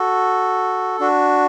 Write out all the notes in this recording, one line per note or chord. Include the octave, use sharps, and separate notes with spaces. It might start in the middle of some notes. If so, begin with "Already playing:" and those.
Already playing: F#4 A4
D4 F#4